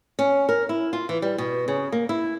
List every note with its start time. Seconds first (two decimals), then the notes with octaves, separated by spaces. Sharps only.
0.19 C#4
0.49 A#4
0.69 E4
0.93 F4
1.09 E3
1.22 G3
1.38 B2
1.68 C#3
1.92 A#3
2.09 E4